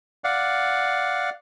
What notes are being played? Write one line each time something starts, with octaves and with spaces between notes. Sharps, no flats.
D5 F5 F#5